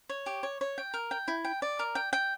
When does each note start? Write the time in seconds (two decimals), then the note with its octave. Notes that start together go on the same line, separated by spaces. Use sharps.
0.09 C#5
0.26 G4
0.43 C#5
0.61 C#5
0.78 G5
0.94 A#4
1.11 G5
1.28 E4
1.45 G5
1.62 D5
1.79 A#4
1.95 G5
2.13 G5